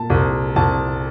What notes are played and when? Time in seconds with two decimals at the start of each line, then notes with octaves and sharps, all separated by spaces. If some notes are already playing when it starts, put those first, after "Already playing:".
Already playing: A#2 A5
0.10 C2
0.56 C2 A5